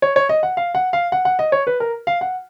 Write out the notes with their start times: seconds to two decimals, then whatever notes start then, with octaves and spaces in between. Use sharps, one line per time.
0.02 C#5
0.16 C#5
0.29 D#5
0.43 F#5
0.57 F5
0.75 F#5
0.93 F5
1.12 F#5
1.25 F#5
1.39 D#5
1.52 C#5
1.67 B4
1.80 A#4
2.07 F5
2.21 F#5